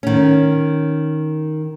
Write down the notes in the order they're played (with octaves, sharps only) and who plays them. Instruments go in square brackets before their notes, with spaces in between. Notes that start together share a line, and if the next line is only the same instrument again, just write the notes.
[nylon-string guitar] D#3 C#4